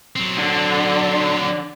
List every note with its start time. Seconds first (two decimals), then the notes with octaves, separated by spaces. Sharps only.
0.16 F#3 C4
0.38 D3